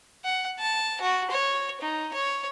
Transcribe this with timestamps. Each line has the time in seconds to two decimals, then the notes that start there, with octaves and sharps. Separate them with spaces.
0.25 F#5
0.59 A5
1.01 F#4
1.31 C#5
1.81 D#4
2.13 C#5